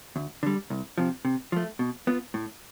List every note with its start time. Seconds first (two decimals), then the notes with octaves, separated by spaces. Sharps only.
0.16 D2
0.43 D3 G3
0.70 C2
0.98 C3 F3
1.25 C3
1.52 F3 A3
1.79 B2
2.07 B3 F4
2.34 A2